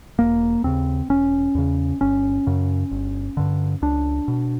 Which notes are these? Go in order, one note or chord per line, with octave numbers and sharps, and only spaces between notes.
E1 A#3
D#2 C#3 C4
E1 C#4
E2 C#3
G1 C#4
F#2 C#3
G1
G2 D3
C#2 D4
B2